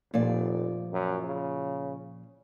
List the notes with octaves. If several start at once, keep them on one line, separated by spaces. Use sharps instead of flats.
F1 A#2 F3 D5
F#2
C#3